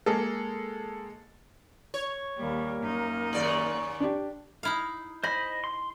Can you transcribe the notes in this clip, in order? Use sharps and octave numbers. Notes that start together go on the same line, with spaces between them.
G#3 A#3 G#4 A4
C#5
D#2 G3 A#3
F#2 D#4
D#2 G#2 D5
D4 G4
D#4 E4 F5
C5 D#5 G#5 B5
C6